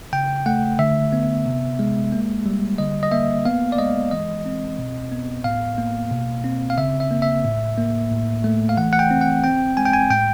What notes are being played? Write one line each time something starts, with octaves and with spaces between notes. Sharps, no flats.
C#3 G5
A3 F#5
D3 E5
B3
C3
G#3
A#3
G3
D3 D#5
D#5
A#3 E5
B3 F5
D5
G#3 D#5
E3 D#5
C4
B2
B3
A2 F5
A#3
B2
C4
F5
C#3 E5
E5
A#3
E5
A2
A#3
A2
A3
F5
E3 F#5
F#5
G5
C4
F#5
C4 G5
G#3 G#5
G5
G#5
A2 G5